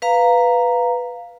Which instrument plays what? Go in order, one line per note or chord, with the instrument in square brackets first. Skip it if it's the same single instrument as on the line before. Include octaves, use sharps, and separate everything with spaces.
[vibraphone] B4 F5 A#5